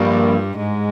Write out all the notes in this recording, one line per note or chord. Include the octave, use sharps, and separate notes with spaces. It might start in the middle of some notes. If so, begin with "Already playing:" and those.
Already playing: G2 F3 G3 A#3 F4 A#4 D5
G#2 G#3